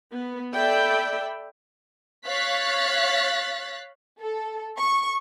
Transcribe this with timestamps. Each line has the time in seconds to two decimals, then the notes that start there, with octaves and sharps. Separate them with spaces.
0.12 B3
0.54 A4 D5 E5 G5 B5
2.27 C#5 F5 F#6 A6 B6
4.19 A4
4.77 C#6